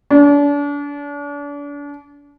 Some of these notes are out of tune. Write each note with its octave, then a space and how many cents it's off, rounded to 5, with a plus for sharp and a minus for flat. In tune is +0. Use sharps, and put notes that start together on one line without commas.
D4 -35